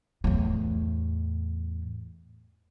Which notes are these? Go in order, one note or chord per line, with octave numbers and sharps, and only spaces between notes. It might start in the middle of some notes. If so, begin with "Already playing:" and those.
E2 A2